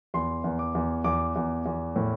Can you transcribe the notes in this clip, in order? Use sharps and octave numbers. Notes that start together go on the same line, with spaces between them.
E2 C6
E2
D6
E2
E2 D6
E2
E2
A2